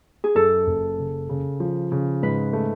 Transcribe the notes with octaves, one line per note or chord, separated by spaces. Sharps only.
G#4
F#2 A4
F#1
C#3
C#3
F3
C#3
G#2 B4
A3